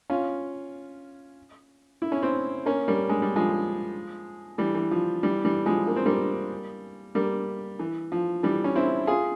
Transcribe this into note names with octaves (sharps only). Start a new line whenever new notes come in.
C#4 F4
E4
C#4
C4 E4
A#3 C#4
G3 A#3
G#3
G3
F3 G#3
E3 G3
E3
F3
E3 G3
E3 G3
F3 G#3
A#3
C4
G3 A#3
G3 A#3
E3
F3
E3 G3
C#4
C4 E4
F4 G#4